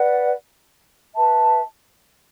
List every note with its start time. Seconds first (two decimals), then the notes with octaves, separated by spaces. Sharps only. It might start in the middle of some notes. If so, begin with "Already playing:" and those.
Already playing: B4 D5 F#5
1.15 B4 E5 A5